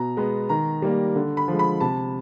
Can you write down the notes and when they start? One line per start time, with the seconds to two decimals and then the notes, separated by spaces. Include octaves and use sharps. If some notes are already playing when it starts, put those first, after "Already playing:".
Already playing: B2 A#5
0.17 G#3 B3
0.49 D#3 A#5
0.82 G3 A#3
1.15 D3
1.37 B5
1.48 F3 G#3
1.59 B5
1.81 C3 A5